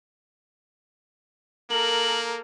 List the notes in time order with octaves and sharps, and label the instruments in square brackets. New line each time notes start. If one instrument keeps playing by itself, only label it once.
[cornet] A#3 [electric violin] A4 A#4 [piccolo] F#7